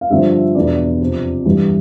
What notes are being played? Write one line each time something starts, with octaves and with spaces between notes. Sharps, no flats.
F5
G2 D3 F3 E5
E2 B2 B3 D4 D5
F2 C3 F3
G2 E3 G3